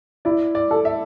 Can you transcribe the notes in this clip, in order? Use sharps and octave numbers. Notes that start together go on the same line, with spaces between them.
E4 D5
D5
A4
E5